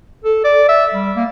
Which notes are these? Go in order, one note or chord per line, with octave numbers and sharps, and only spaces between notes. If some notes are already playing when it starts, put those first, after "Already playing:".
A4
D5
E5
G3
A#3